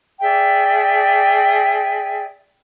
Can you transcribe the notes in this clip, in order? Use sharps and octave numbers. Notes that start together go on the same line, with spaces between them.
G#4 D5 E5 G5